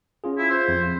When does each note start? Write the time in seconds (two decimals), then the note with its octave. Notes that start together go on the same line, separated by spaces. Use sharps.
0.24 C#4 F4 G#4
0.38 E4
0.50 C5
0.68 F2